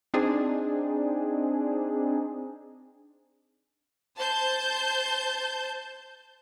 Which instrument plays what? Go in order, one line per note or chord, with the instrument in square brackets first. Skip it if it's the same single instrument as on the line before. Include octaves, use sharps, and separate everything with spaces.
[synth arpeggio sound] C4 D4 D#4 G#4
[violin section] C5 A5 G6